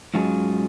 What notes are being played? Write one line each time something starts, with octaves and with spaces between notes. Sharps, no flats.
G#2 F#3 C#4 F4 G#4